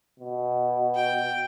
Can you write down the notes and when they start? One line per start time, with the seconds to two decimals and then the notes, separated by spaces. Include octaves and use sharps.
0.19 B2
0.96 G5